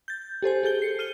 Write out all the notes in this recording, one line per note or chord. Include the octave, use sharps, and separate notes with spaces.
G6 A6
G4 A4 C5 G#5
G#4 A4 G6 G7
C7 C#7
F6 D#7 G7